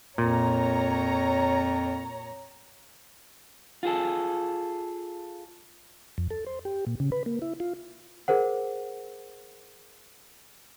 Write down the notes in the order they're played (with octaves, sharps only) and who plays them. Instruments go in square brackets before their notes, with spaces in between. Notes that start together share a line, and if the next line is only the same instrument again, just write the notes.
[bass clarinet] F2 [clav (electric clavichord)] A#2 [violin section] C#5 A#5
[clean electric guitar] F4 G#4 A4
[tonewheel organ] F2
A4
C5
G4
A#2
C#3
B4
A#3
E4
F4
[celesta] G#4 A#4 C5 F#5